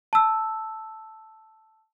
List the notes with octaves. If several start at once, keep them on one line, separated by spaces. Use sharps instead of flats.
A5 E6